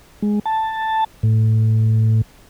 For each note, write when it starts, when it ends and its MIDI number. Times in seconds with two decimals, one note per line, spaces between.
0.22 0.39 56
0.46 1.04 81
1.23 2.21 45